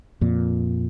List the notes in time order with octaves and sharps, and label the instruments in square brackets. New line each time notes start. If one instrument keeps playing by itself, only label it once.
[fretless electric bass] F2 A#2